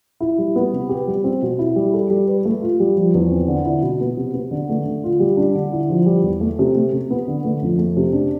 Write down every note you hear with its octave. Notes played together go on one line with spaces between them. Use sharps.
E4
G3
B3
C3
G4
G3
C4
B2
E4
G3
A4
G3
B4
A3
F4
G3
F3
E2
C4
D3
E4
B2
B3
C3
B3
D3
A3
D3
F4
G3
D4
D3
E4
F3
G3
E2
A3
C3
A3
C3
B3
D3
A3
F2
A3
C3
D4